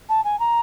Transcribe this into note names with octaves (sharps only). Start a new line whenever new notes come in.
A5
G#5
A#5